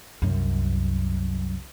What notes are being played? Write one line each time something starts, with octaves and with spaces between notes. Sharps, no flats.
C2 F#2